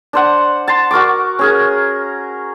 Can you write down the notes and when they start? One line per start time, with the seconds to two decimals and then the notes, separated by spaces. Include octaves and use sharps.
0.13 D4 C5 F#5
0.68 A5 C6
0.91 F#4 A#4 C#6 D6
1.39 C#4 G#4 A#4